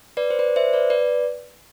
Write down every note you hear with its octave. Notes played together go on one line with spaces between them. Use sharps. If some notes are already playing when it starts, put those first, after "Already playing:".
B4 D5
C5
B4 D5
C5 E5
B4 D5
B4 D5